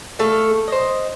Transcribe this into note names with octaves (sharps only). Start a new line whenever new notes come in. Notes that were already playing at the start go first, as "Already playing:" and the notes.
A3 A4 F5
C5 D#5